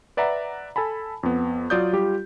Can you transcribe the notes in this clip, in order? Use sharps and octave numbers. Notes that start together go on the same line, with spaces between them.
B4 D5 E5 F#5 A#5
A4 G#5 A5 B5
F2 B3
F#3 F4 D5 D#6 G6
G3 F4 G4